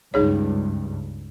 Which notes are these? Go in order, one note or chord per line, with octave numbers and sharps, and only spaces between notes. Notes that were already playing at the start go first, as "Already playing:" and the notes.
C#2 G2 D#4 G#4 C#5